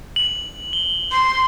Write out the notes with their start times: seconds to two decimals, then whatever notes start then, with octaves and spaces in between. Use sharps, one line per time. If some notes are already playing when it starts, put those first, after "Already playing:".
0.16 F#7
0.73 G7
1.12 C6